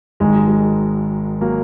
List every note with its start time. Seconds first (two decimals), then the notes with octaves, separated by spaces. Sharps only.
0.20 G#1 G#2 D#3 G#3
0.34 F#3
0.47 G#3
1.41 F#3 A#3